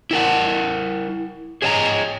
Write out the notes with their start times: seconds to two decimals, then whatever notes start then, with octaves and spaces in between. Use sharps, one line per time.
0.11 E4 A#4 F#5
1.62 G#4 C#5 D#5 G#5 A#5